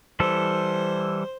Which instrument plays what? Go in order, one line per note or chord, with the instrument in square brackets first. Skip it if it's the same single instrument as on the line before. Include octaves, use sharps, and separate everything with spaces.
[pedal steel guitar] E3 G3 A4 [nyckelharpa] C5